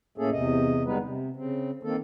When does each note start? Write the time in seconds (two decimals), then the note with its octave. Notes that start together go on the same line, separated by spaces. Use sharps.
0.18 A2 A3 A#3 C#4 G#4 A4
0.32 E2 C3 D#5
0.86 D3 G3 G#3 B3 D#4 B4
1.02 C3
1.36 C#3 C4
1.83 D#3 A#3 C4 A4